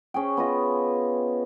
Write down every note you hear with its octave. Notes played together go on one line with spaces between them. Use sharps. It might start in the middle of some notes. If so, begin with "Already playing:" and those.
C#4 G#4 G5
B3 F4 D#5